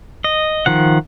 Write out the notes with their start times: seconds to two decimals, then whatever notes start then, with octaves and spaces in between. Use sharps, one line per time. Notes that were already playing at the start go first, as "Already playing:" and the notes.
0.24 D#5
0.66 D#3 F3 F#5